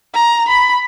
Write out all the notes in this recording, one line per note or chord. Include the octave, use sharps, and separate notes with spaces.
A#5
B5